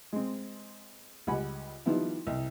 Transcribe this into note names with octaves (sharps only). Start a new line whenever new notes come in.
G#3 C4
C#2 G3 F#5 G#5 B5
D#3 F3 G3 B3 E4
C2